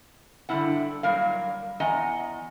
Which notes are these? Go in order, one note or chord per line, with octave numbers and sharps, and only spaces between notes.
G2 D3 G3 D4 E4 F#5
A#2 F#3 G3 A#4 F5
E2 D#5 F#5 G#5 A#5